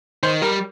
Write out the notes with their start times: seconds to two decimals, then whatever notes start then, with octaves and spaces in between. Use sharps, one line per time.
0.23 D#3 C5
0.42 G3 A#4